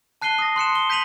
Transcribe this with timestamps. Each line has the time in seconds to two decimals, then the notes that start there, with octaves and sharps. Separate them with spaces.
0.22 A5 F#6 C7 D#7 G7
0.39 D#6 A#6
0.56 C6 F#6 C#7 E7
0.75 G7
0.90 G6 B6 D#7 F7 F#7